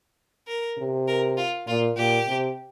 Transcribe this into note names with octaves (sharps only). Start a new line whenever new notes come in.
A#4
C3
A#4
F4
A#2 F4
A#2 G4
C3